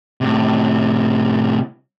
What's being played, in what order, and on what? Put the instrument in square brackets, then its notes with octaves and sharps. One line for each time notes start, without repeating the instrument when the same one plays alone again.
[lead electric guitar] A2 C3